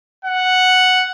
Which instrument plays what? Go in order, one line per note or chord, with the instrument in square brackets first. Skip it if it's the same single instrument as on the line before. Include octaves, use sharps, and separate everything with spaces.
[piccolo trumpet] F#5